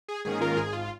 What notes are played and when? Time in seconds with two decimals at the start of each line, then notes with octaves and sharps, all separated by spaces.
0.08 G#4
0.25 G#2 D#3 A#3 C#4 G#4
0.41 F4 A#4
0.57 G#1 G#4
0.73 F4